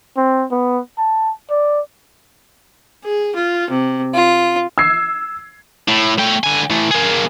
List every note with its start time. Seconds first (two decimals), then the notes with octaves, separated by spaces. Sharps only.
0.17 C4
0.51 B3
0.98 A5
1.50 D5
3.02 G#4
3.35 F4
3.69 C3
4.13 F4
4.78 E6 G#6 C7
5.88 A2
6.18 A3 G5
6.44 D3 G#5
6.70 E3 A3
6.91 A#3 G#4